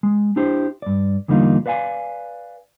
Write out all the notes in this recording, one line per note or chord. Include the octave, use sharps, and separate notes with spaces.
G#3
D4 E4 G4 C5
G2 D5
E2 D3 G3 A#3 D#4 F4
B4 D5 F5 F#5 G#5